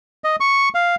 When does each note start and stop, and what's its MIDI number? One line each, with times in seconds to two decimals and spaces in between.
0.24 0.36 75
0.40 0.69 85
0.75 0.95 77